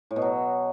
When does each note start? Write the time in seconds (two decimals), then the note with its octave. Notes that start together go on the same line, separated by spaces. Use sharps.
0.11 A2
0.16 B2
0.22 F#3